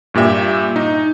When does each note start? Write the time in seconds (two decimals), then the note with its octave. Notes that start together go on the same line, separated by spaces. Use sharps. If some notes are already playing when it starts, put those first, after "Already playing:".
0.14 G2 A#2 G4 E5
0.76 D#4